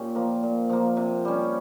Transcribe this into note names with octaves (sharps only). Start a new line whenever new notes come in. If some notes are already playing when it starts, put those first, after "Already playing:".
Already playing: A#2 C#4 G4
F3 A#3
A#2
F3 A#3
C3
G3 C#4